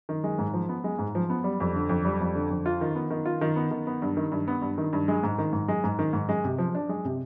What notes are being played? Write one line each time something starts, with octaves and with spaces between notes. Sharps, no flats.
D#3
G#3
G#2
F3
B3
G#3
G#2
F3
B3
G3
F2
D3
F2
G3
F2
D3
F2
F4
D#3
B3
D#3
F4
D#3
B3
D#3
B3
G2
D#3
G2
B3
G2
D#3
G2
G#3
G#2
D#3
G#2
G#3
G#2
D#3
G#2
G#3
C3
F3
D4
G#3
C3